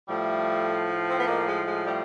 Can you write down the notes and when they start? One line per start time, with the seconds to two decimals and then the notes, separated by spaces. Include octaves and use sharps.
0.08 A2 F3 G3 A3
1.07 C4
1.18 B3
1.26 G#3 A#3
1.46 G#3
1.66 G#3
1.86 G3 A3